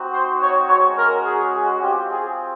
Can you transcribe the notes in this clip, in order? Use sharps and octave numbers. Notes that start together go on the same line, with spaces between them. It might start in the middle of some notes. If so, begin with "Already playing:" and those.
Already playing: C4 D#4 F#4
C5
C#5
G#3 C#4 F#4 C#5
A#4
G#4
G#4
C4 F4 G4
G#4